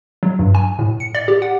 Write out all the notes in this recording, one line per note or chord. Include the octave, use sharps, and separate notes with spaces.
F#3
G2
G#5
A2
C#7
D5
G4
F#5